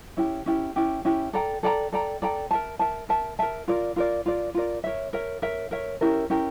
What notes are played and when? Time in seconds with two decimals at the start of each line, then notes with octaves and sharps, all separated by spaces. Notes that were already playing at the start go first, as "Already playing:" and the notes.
0.17 C#4 E4 G4
0.46 C#4 E4 G4
0.76 C#4 E4 G4
1.05 C#4 E4 G4
1.33 A4 D5 G5 A#5
1.63 A4 D5 G5 A#5
1.92 A4 D5 G5 A#5
2.22 A4 D5 G5 A#5
2.51 A#4 E5 A5
2.79 A#4 E5 A5
3.09 A#4 E5 A5
3.39 A#4 E5 A5
3.68 F4 A#4 D5
3.96 F4 A#4 D5
4.26 F4 A#4 D5
4.54 F4 A#4 D5
4.84 A#4 C#5 E5
5.13 A#4 C#5 E5
5.42 A#4 C#5 E5
5.71 A#4 C#5 E5
6.01 C#4 E4 G4 A#4
6.30 C#4 E4 G4 A#4